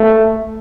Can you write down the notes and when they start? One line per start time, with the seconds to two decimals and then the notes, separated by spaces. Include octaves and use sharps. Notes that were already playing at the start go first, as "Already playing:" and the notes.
Already playing: A3